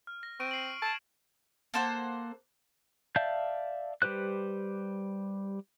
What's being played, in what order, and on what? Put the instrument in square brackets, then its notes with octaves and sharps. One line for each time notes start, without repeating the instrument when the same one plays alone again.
[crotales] F6
A#6
[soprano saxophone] C4 [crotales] C#6 D7 D#7
[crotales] C7 F#7
[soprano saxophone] A5 [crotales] G#6 C7 E7
[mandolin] A#3 A4 C5 F#5
[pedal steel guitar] D5 E5 F5 A5 G6
G3 G4 B4 C5 F#6